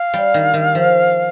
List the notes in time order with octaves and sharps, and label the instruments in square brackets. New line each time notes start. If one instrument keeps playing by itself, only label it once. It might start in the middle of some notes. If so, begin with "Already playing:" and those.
Already playing: [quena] F5
[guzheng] G3
D#3
D#3
F3